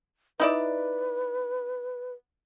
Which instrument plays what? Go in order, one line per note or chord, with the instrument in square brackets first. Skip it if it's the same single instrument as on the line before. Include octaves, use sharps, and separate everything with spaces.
[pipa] D#4 E4 D5 [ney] B4